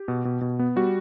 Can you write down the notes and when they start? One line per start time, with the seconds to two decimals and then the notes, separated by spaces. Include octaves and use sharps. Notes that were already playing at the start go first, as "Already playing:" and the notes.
Already playing: G4
0.08 B2
0.25 B2
0.41 B2
0.59 B3
0.76 G3 F#4